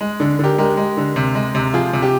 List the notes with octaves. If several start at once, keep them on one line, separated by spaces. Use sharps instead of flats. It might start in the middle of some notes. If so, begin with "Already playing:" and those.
G#3
D3
D3 G4 A#4
G#3 G4 A#4
G#3
D3
C3
G#3
C3
F3 F4 G#4
C3
G4